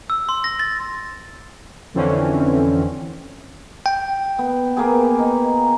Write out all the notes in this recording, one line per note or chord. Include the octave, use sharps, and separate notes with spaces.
E6
C6
A#6
A6
F2 D3 E3 C4 C#4
G5
B3
A#3 B3 G#4
D#4